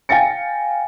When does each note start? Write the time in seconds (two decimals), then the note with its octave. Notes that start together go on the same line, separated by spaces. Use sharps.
0.09 F5 G5 G#5 A6 A#6 C#7